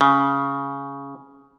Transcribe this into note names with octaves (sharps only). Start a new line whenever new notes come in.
C#3